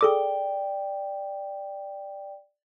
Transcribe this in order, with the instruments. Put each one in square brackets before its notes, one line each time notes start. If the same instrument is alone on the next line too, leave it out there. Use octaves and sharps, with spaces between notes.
[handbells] G#4 A4 D6 [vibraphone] D5 G5